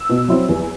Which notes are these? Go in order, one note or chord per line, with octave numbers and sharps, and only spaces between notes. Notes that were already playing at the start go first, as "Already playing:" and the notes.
Already playing: E6
B2
F#3 C4 E4
E2